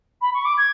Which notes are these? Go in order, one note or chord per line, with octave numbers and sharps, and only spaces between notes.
B5
C#6
D6
G#6